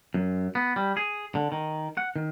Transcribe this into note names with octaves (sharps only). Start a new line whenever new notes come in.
F#2
B3
G3
G#4
D3
D#3
F#5
D#3